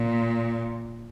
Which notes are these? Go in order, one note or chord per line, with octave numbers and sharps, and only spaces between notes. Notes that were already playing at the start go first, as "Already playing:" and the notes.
Already playing: A#2